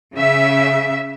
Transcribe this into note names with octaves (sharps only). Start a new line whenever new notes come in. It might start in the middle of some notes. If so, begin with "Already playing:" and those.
C#3 E5